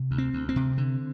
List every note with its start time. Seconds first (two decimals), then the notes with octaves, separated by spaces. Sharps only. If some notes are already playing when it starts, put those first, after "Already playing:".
Already playing: C3
0.11 D2
0.18 C4
0.33 D2
0.49 C4
0.56 C3
0.78 D3